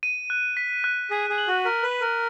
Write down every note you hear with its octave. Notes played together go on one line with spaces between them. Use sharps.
D#7
F#6
B6
F#6
G#4 B6
G#4
F#7
F#4
A#4 B6
B4
F#7
A#4